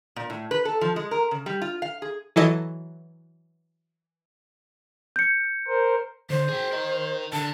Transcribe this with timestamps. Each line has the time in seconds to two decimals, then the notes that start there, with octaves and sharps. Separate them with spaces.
0.16 A#2
0.30 A2
0.51 B4
0.65 A4
0.81 F3
0.96 G#3
1.11 A#4
1.31 C#3
1.46 G3
1.62 F4
1.82 F5
2.02 G#4
2.36 E3 F#3 E4 A4 D#5
5.16 G6 C#7
5.68 A#4 C5
6.30 D3 C5
6.49 G#4 G5
6.72 A#4 D#5
7.33 D3 A5